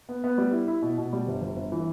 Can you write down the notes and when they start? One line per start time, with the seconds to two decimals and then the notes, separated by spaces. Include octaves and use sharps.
0.09 B3
0.24 B3
0.38 G3
0.52 E4
0.68 E4
0.82 B2
0.98 B2
1.13 G3
1.27 G1
1.41 G1
1.56 G1
1.72 E3